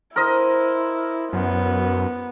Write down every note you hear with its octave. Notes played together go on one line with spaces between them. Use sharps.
E4 A#4 C5 D#5
F#2 B3